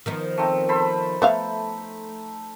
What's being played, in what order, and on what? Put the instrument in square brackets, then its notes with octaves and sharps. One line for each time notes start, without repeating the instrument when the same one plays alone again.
[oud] D#3 F3 B3
[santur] A3 C4 D#4
A4 C5 B5
[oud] A3 [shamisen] B3 E5 F5